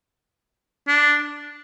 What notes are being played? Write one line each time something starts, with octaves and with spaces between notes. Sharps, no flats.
D4